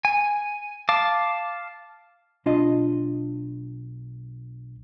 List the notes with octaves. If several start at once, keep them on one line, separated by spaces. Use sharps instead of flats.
G#5
F5 A5 D6
B1 D4 F4 D#5